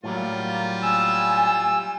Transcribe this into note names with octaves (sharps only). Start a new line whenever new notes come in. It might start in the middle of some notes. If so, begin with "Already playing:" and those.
A2 F#3 G3 A#3 F4
G#5 E6